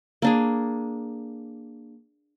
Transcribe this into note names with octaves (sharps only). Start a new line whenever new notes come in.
A#3 D4 G#4